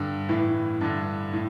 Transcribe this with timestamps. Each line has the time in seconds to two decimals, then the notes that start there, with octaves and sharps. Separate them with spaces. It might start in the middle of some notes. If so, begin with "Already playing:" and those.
Already playing: G2 D3
0.29 A2 E3
0.81 G2 D3
1.33 A2